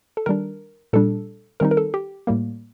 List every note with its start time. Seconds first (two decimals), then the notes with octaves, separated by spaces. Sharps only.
0.17 A4
0.26 D#3 G3 D4 A#4
0.93 A#2 G3 D4 A4
1.60 D#3 G3 C4 D#4 A#4
1.71 A#4
1.77 A4
1.94 G4
2.27 A2 G3 A#3